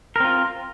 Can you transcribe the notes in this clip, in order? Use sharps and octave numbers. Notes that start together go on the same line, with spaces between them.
C4 F4 A#4